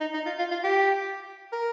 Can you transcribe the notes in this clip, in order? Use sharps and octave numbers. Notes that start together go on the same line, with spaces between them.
D#4
D#4
F4
F4
F4
G4
A#4